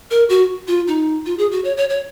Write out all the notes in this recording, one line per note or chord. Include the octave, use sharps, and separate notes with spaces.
A#4
F#4
F4
D#4
F4
G#4
F#4
C#5
C#5
C#5